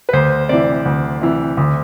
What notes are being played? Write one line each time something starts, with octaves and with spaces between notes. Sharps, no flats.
B4
D2 C5
C3 E3 D5
D2
C3 E3
D2